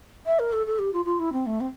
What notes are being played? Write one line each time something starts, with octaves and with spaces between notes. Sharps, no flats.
E5
A#4
A4
A4
G4
F4
F4
E4
C4
A3
C4